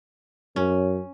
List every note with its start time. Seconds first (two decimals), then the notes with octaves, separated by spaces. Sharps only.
0.56 F#2 C#4